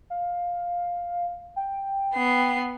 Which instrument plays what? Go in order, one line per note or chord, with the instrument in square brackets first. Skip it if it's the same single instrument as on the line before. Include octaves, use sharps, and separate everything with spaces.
[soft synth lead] F5
G5
[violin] B3 C7